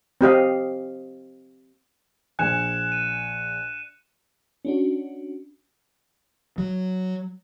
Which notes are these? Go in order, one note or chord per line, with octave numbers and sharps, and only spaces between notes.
C4 G4 D#5 F5
A#1 G#5 F#6 C#7 E7
D#7
C#4 D4 F#4
F#3